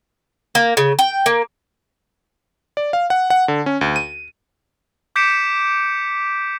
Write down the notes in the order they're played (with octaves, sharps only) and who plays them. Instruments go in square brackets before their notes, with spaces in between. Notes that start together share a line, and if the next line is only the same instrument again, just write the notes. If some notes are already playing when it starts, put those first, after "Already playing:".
[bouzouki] A#3
C#3
G5
A#3
[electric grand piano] D5
F5
F#5
F#5
D3
C#4
D2
D#7
[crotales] D6 G6 B6 C#7 D7 E7